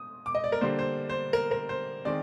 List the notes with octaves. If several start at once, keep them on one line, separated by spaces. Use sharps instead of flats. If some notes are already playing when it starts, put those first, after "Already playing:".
Already playing: D#6
D6
D#5
D5
A#4
D3 G3 A#3 C5
C5
C5
A#4
A#4
C5
D#3 G#3 C4 D5